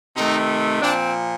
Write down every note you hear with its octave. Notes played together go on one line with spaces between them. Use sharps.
C3 D#3 A3 D#4
A#2 F3 C4 D4